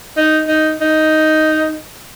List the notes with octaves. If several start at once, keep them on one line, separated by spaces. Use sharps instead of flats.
D#4
D#4
D#4